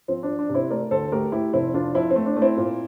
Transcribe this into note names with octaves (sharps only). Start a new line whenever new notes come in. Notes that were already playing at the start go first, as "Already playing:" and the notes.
F3 C4
D4
F3
D4
C3
C4 E4
A3 A#4 D5
D2 A4 C5
A3 G4 A#4
A3 E4 G4
F1 C4 E4
F1 D4 F4
F2 C4 E4
C4
A3
D4
A3
C4 E4
A#2